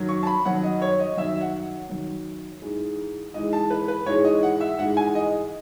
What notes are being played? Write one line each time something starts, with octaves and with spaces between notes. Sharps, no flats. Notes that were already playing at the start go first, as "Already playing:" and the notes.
Already playing: F#2 D#3 F#3
C#6
A5
B5
F#2 D#3 F#3 F#5
D#5
C#5
D#5
F#2 D#3 F#3 E5
F#5
F#2 D#3 F#3
G#2 E3 G#3
G#2 E3 G#3 D#5
A5
B4
B4
G#2 E3 G#3 C#5
D#5
F#5
E5
G#2 E3 G#3 F#5
G#5
D#5